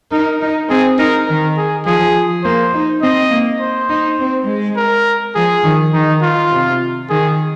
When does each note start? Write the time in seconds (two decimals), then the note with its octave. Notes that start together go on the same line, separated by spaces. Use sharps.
0.12 D#4 A#4
0.41 D#4
0.70 C4 G#4
0.98 D#4 A#4
1.28 D#3 A#4
1.57 G#4
1.86 F3 G#4
2.44 A#3 C5
2.73 D#4
3.02 C4 D#5
3.31 A#3
3.61 C5
3.89 D#4
4.19 C4
4.48 G#3
4.76 A#4
5.35 F3 G#4
5.64 D#3
5.93 D#3 D#4
6.22 F4
6.51 C3
7.09 D#3 G#4